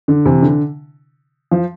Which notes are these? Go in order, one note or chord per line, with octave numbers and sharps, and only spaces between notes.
D3
C3 E3
D3
F3